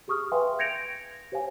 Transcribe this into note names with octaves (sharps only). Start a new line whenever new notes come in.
G4 G#4 C#6 D#6 F6
B4 E5 F5 G5 G#5 C6
G6 G#6 A#6 C#7 D7 F7
G4 C5 C#5 F5 G#5